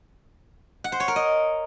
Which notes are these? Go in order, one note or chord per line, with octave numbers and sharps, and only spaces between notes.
F#5
C5
C#5
A#4
D#5